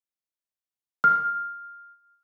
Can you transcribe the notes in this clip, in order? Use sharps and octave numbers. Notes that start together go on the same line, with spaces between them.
F6